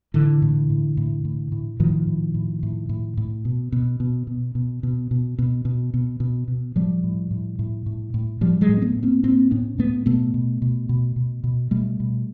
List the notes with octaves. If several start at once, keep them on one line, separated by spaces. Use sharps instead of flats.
A2 D3 E3
A2
A2
A2
A2
A2
A2 D#3 F3
A2
A2
A2
A2
A2
B2
B2
B2
B2
B2
B2
B2
B2
B2
B2
B2
B2
A2 F3 G3
A2
A2
A2
A2
A2
A2 F3 G3
F#3 G#3
A2
C4
A3 B3
A2
A#3 C4
A2 A#3 C4
A2 B3 C#4
A2 A3 B3
B2 A3 B3
B2
B2
B2
B2
B2
B2 G3 A3
B2